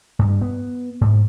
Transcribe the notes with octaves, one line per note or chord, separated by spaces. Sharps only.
G2
B3
G#2